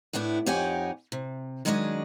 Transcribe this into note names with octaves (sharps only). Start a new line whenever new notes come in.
A2 A3 B3 D4 E4
F2 D#4 G4 C#5 F#5 G#5
C3
D#3 F#3 G#3 C#4 D4 D#5